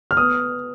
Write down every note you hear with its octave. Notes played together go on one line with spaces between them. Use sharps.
F6
B3 D#6